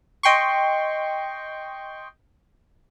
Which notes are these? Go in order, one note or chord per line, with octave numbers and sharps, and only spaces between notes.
D#5 G5 C6 C#6